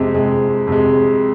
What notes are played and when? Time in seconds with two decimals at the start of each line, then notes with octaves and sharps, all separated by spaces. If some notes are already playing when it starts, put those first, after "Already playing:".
Already playing: F2 C3 G#3
0.14 F2 C3 G#3
0.67 F2 C3 G#3